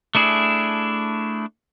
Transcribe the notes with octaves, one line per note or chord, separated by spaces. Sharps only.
A3 D4 E4 G#4